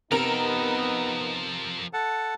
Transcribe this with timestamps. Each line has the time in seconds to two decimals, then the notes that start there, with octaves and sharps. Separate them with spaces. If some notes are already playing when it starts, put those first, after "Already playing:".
0.11 C3 F3 B3 D#4 A4 A#4 F7
1.93 A4 F#5 A5